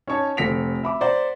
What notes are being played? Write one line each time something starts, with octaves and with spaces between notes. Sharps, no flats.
C#4 D#4 C#5 A5
F1 F3 A4 B6 D7 F7
E5 B5 D6
C5 D5 F#5 A#5